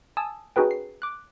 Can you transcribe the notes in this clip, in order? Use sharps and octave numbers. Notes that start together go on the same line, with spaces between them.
G#5 A5 D#6 E6
C#4 D#4 F#4 G#4 B4 G5
C7
D6 F#6